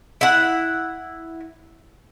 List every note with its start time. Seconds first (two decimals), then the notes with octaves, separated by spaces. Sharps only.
0.21 E4 F#5